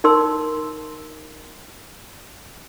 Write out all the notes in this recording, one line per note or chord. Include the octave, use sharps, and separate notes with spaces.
D#4 A#4 C6 E6